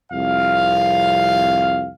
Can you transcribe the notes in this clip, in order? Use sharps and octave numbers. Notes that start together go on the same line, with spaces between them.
C2 F2 F5